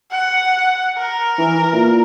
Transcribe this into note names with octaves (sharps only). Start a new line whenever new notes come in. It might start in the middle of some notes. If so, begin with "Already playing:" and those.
F#5
A#4
E3
A#2